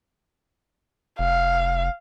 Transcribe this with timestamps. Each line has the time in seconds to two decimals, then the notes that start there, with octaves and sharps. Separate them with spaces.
1.19 F1 F5